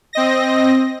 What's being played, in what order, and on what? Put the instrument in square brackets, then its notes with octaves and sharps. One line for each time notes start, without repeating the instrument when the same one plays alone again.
[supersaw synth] C4 D#5 A#6